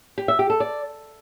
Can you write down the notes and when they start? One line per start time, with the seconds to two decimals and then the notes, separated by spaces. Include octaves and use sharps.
0.18 G4
0.28 E5
0.39 G4
0.50 A4
0.60 D5